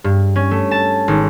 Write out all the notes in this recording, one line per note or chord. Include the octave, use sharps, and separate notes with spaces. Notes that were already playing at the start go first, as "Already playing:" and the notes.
G2
C#4
A3
A5
G#1